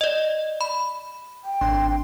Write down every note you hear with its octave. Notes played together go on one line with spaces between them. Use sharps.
D5 D#5
B5
G5
G#1 D4 C6